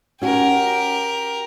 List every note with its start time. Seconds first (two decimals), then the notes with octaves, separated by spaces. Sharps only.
0.22 C#4 F#4 G4 A#4